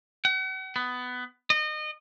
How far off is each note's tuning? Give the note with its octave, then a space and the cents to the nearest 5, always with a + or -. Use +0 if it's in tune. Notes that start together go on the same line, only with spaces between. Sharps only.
F#5 +40
B3 +15
D#5 -30